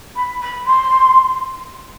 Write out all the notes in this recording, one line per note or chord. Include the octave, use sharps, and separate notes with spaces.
B5
B5
C6